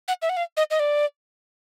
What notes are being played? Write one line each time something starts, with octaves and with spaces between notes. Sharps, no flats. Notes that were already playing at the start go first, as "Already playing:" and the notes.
F#5
E5
F#5
F5
D#5
D#5
D5